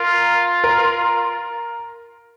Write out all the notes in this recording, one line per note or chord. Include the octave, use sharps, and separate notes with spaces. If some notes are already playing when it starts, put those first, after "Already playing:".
Already playing: F4 A#4
A#4